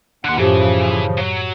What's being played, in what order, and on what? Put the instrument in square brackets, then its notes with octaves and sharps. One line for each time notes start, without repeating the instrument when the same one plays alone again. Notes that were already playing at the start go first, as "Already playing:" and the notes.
[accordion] D#2 F#5 [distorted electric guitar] D3 C6
[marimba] F#2 A2 G4 [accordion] C#3 F3 [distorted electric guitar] E3
[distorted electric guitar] F#3